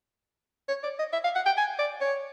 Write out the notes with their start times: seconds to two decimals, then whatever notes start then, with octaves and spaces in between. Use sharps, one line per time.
0.69 C#5
0.83 D5
0.99 D#5
1.13 E5
1.24 F5
1.35 F#5
1.46 G5
1.57 G#5
1.79 D5
2.01 C#5